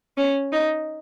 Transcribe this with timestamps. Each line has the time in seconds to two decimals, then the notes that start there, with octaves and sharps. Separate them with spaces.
0.17 C#4
0.53 D#4